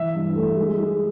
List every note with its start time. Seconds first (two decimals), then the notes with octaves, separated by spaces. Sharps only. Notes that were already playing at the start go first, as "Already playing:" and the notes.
Already playing: E3 E5
0.15 G2
0.36 A3
0.57 G#3
0.78 G#3